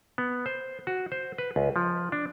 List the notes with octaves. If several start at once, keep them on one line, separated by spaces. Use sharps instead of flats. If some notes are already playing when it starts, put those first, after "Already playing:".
B3
C5
F#4
C5
B4
C#2
F3
D4